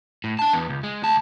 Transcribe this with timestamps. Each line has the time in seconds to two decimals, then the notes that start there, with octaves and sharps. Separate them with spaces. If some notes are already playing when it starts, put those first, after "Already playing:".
0.24 A2
0.39 D4 A5
0.53 E2 B3
0.69 C#2
0.83 G#3
1.02 D2 A5